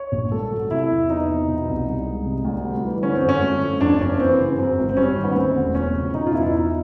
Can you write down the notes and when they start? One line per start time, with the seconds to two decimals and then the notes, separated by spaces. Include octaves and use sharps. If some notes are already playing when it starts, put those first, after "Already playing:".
Already playing: C#5
0.12 A#1
0.32 A3 A4
0.51 F#3
0.71 C3 E4
0.90 E2
1.10 E2 D#4
1.28 F3
1.48 B2
1.68 C2
1.87 C2
2.07 G#3
2.26 C3
2.45 D2
2.64 G3
2.84 E3
3.03 D3 C#4
3.15 C4
3.23 F#2
3.29 C#4
3.42 A3
3.61 F3
3.80 F2 D4
4.00 F#1 C#4
4.20 E3 C4
4.39 C#3
4.58 F#2 C4
4.79 G#1
4.89 C4
4.97 G3 C#4
5.16 D#3
5.24 B3
5.36 D2 C4
5.56 E1
5.75 F3 C#4
5.95 C#3
6.13 B2 D#4
6.27 F4
6.33 E2 E4
6.52 E2 D#4